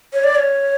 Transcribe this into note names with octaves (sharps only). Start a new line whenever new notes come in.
C#5
D5
C#5